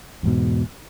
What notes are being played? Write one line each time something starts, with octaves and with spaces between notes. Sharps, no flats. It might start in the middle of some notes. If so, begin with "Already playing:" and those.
E2 G#2 B2